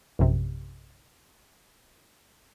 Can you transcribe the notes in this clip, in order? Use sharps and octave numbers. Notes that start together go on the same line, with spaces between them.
A#1 F#2 C3